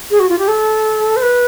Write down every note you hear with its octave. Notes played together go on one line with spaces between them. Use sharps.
G#4
F#4
F4
G4
A4
C5
B4